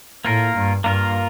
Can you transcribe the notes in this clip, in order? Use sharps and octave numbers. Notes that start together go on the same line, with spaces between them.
A2 A#3 F4 A#4
G2
G2 A#3 F4 A#4